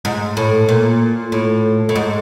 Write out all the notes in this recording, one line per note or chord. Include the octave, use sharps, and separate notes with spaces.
G#2
A2
A#2
A2
A2
G#2